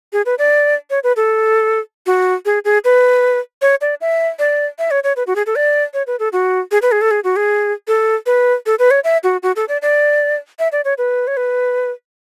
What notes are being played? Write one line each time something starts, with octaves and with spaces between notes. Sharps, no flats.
G#4
B4
D5
C#5
B4
A4
F#4
G#4
G#4
B4
C#5
D5
E5
D5
E5
C#5
C#5
B4
F#4
G#4
A4
D5
C#5
B4
A4
F#4
G#4
B4
G#4
A4
G#4
F#4
G#4
A4
B4
A4
B4
C#5
E5
F#4
F#4
A4
D5
D5
E5
D5
C#5
B4
C#5
B4